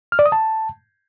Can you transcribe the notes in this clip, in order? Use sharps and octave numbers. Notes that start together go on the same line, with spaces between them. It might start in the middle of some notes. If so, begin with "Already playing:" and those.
F6
D5
D#6
A5